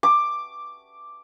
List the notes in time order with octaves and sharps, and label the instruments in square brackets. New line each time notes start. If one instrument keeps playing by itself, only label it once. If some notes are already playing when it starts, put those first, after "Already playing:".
[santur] D6